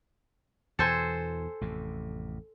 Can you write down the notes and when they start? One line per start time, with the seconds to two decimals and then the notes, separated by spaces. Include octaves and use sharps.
0.79 E2 B2 E3 A4 C5 G#5
1.61 A1 F2 C3